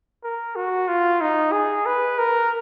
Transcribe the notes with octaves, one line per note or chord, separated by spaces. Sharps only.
A#4
F#4
F4
D#4
G#4
B4
A#4